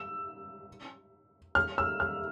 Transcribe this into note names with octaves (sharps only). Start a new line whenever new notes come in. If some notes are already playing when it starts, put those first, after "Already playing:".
Already playing: E6
F6
E6
F6